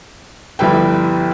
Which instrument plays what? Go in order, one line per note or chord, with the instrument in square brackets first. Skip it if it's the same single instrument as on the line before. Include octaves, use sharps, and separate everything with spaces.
[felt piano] G1 F3 G3 E4 B4 G5